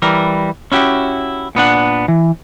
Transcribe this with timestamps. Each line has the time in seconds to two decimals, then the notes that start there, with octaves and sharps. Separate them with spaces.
0.02 E3 G3 A#4
0.72 C#4 E4 F#4 G4
1.55 A#2 B3 D4 F#5
2.08 E3